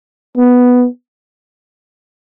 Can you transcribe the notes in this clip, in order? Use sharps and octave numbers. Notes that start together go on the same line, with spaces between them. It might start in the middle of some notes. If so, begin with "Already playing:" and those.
B3